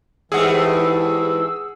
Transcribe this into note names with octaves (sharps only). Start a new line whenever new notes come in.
G#2 E3 G3 A3 G#4 F#5 E6